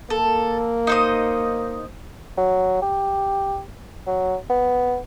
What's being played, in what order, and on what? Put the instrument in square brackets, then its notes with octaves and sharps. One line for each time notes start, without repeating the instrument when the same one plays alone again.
[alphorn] A#3 [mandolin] A4
[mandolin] D#4 C5 D#5
[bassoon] F#3
G4
F#3
B3